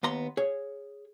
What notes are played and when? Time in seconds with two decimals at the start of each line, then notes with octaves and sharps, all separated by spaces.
0.03 D#2 B3 A#5 C6
0.37 G#4 C#5